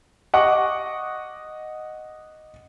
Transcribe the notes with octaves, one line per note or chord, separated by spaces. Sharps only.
D#5 F#5 C#6 D6